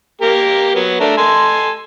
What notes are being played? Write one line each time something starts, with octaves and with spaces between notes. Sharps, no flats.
A#3 G4 A#4
F#3 B3
A3 D4 A#4
A4 G#5 C6